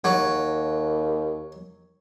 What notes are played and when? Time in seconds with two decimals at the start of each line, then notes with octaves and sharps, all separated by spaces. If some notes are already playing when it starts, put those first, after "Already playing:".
0.04 D#2 F#3